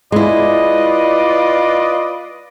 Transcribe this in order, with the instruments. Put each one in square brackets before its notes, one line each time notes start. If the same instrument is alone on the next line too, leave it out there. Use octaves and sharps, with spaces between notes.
[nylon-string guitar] G#3 E4 [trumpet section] F4 B4 D5 [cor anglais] D#5